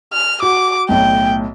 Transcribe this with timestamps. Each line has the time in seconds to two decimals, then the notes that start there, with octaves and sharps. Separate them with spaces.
0.12 F6
0.42 F#4 D6
0.89 B1 A2 G5